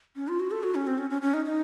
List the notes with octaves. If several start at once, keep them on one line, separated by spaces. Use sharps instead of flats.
C#4
F4
F#4
A4
F#4
C#4
C4
C#4
C#4
C#4
D#4
D#4